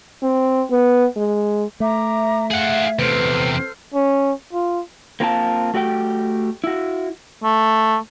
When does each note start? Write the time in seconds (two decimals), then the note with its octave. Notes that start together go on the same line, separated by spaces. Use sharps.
0.23 C4
0.71 B3
1.17 G#3
1.80 A3 E5 A#5 D6
2.51 G#4 F5 F#5
2.99 E2 C3 A4 B4 C5 F6
3.94 C#4
4.53 F4
5.20 A#3 C4 F4 A#4 G#5 A5
5.74 A3 F#4 G4 D5 G5
6.64 E4 F#4
7.43 A3